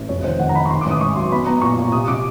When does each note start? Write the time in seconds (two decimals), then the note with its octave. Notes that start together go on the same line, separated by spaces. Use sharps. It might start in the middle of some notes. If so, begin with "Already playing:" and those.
Already playing: A1
0.09 F1 C#5
0.24 D#3 C5
0.39 D#3 F#5
0.49 A#5
0.55 D#3 B5
0.66 C#6
0.70 D#3 C6
0.81 D6
0.86 A1 D#6
1.00 G#2 C#6
1.16 F#3 C6
1.31 B3 B5
1.47 B3 A#5
1.62 A#2 C#6
1.77 A#2
1.92 C3 D#6
2.08 C3 D6